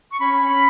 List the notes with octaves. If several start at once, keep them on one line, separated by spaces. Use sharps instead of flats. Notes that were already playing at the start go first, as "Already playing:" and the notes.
C#6
C#4 B5
C#4